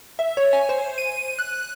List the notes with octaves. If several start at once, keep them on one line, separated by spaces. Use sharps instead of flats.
E5
C#5
G#5
C5
D#7
F#6